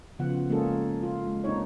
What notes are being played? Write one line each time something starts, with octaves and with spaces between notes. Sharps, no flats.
C#3 F3 B3 F4 F#5
G#3 A#3 C#4 F4 G#4 A4
F4
G#3
A#3 C4 D4 D#4 C#5